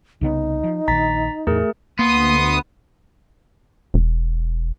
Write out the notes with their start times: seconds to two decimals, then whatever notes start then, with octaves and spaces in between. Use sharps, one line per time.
0.21 C2 C#3 B3 D#4
0.64 F3
0.88 A#1 D#3 A#5 A6 B6
1.47 E2 A2 A3 G#4 A#4
1.99 D2 A#3 B3 C6 D#6
3.94 E1